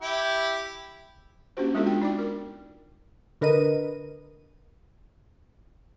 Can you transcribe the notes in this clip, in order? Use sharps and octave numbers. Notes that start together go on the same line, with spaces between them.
E4 G4
A#3 C#4 D4 F#4 G4 C5
G#3 B3 D4 F4 F#4 A4
G5
D#4 D5 G5 D6
A#4
D3 A#4 B4 D#5 D#7